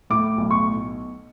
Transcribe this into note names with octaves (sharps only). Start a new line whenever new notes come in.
A2 D6
B1
C#6